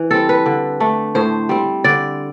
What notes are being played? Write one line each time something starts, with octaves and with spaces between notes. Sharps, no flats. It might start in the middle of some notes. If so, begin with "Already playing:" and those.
Already playing: E3
G3 C4 A4
B4
D3
A3 D4
A2 C5
G3 C4
D3 D5